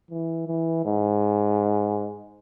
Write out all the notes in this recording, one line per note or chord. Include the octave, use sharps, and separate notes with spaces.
E3
E3
G#2